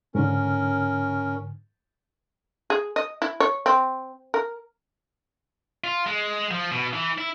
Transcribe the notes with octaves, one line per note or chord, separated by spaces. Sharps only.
G#2 D3 C#4 A#4
G#4
D#5
E4
C#5
C4
A#4
F4
G#3
F3
B2
E3
E4